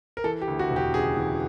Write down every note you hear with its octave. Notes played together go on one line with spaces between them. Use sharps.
A#4
E3 A4
G4
D2
F#4
E1
G4
C#3 G#4
E3